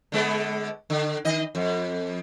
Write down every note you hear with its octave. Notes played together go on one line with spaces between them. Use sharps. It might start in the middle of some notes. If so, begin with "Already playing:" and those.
D3 G#3 B3
D3
D#3 D#5
F2